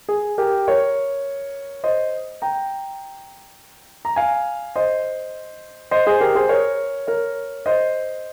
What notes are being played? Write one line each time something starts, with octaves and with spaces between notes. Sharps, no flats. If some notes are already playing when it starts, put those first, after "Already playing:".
G#4
G4 A#4
A#4 C#5
C5 D#5
G5 A#5
A#5
F5 G#5
C5 D#5
C5 D#5
G#4 C5
G4 A#4
G#4 C5
A#4 C#5
A#4 C#5
C5 D#5